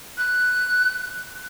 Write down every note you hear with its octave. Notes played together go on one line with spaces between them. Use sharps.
F#6